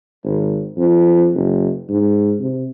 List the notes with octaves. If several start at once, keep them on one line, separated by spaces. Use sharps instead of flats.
G#1
F2
F#1
G#2
C3